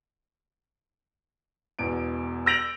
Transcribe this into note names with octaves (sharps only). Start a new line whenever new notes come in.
E1 E2 D7
E6 G6 A#6 D7 F7 F#7